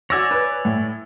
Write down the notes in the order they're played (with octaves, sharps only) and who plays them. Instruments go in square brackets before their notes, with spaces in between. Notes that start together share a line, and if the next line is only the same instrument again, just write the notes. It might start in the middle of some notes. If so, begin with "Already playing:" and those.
[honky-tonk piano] F#4 E6 A#6 [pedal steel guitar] C#5 D5 G#5
[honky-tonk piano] B4
A2